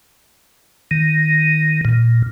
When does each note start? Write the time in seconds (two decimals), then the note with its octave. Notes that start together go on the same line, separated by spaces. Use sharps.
0.91 D#3
1.85 A#2